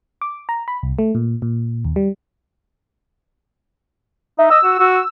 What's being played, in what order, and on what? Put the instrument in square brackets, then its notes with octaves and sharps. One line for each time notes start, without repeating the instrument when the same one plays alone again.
[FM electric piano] D6
A#5
B5
C2
A3
A#2
A#2
D#2
G3
[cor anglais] D#4 [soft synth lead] E5
[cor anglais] D#5 [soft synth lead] E6
[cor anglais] F#4
F#4